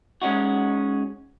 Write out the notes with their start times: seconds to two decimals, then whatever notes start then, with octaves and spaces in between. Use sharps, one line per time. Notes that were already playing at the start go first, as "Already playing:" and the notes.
0.22 G#3 C#4 D#4 F#4